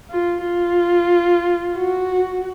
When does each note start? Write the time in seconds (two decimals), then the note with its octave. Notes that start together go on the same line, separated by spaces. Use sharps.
0.10 F4
0.44 F4
1.76 F#4